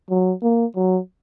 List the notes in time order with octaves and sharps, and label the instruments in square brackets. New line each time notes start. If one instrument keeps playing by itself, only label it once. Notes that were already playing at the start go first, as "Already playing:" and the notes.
[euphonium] F#3
A#3
F#3